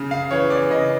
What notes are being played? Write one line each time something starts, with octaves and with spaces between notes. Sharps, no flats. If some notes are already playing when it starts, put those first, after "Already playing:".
Already playing: C#3
F5
E3 C#5
D5
C#3 D#5